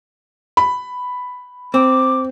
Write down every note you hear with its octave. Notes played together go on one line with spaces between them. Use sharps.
B5
C4 D6